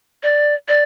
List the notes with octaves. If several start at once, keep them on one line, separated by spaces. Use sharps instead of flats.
D5
D5